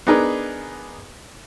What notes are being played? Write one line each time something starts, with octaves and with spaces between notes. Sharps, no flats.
B3 D4 D#4 G#4 A#4 B4